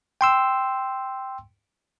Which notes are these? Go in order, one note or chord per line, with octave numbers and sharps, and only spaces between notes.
G5 C6 E6